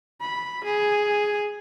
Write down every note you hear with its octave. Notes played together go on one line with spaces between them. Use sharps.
B5
G#4